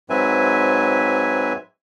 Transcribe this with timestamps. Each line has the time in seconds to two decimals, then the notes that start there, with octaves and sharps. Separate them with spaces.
0.10 G#2 F#3 C4 B4 E5 G#5